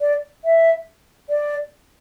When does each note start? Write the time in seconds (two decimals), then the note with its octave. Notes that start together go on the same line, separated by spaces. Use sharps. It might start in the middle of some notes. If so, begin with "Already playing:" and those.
0.01 D5
0.45 E5
1.30 D5